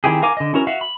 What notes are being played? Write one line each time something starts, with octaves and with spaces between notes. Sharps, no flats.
D#3 C4 E4 G4 G#4
A#4 F5 G#5 D6
D3 D#5
C#4 E4 F#4 A#4
F#4 E5 F5
B5